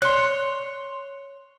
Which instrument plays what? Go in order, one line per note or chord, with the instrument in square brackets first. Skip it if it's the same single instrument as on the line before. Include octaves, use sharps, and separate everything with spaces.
[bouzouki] C#5 [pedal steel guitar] C6 F#6